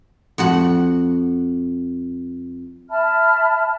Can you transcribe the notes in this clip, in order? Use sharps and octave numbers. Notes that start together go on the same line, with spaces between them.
F2 F#4 F#5
E5 A5 B5 F6